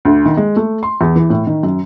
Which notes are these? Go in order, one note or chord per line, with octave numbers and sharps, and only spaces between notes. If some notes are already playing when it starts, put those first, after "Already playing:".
D2
D#3
G#3
A3
C6
E2
E3
A2
D#3
F#2